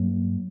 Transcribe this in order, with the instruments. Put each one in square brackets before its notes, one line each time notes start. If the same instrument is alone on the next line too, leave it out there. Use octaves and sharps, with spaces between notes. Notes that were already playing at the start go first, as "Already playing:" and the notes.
Already playing: [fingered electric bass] G2 F#3 A#3